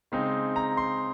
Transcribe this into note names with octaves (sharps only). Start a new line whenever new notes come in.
C#3 G#3 C4 D#4
A#5
C6